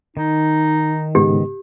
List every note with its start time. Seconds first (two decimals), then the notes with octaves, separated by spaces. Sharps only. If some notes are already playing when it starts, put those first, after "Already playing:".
0.17 D#3 D#4
1.15 G#2 C#3 B3 G4